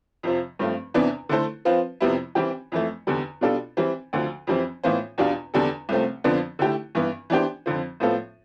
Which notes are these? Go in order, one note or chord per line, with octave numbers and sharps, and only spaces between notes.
F2 C3 F3
G2 F3 A3 C4
E2 C3 E3 B3 D4
D3 A3 E4 A4 C5
F3 C4 F4 B4
F2 C3 G3 B3 E4
E3 G3 C4 G4
F2 E3 A3
E2 D3 G3
B2 G3 D4 F4 A4
E3 G3 C4
D2 D3 F3
F2 E3 G3 C4
A2 E3 B3 F4 C5
E2 B2 G3 D4 F4
E2 D3 G3 D4 A4
C2 C3 F3 A3 C4
F2 D3 F3 B3 D4
D3 A3 E4 G4
G2 E3 B3
E3 B3 D4 G4 C5
F2 D3 F3
A2 F3 B3 F4 A4